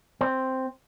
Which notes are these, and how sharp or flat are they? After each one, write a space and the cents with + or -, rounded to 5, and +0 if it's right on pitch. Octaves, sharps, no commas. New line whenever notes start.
C4 +0